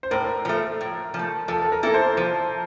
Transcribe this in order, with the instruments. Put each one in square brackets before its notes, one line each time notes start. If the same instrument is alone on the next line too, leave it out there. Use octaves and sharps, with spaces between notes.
[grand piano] C5
[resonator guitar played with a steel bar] A2 [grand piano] A#4
[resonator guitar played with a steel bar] F3 A3
A2
F3
A3
[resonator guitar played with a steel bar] F3 [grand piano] A4
[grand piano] A4
A#4
[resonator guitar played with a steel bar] A#3 E4 A4
[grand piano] C5
[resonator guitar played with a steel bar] F3 [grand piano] C5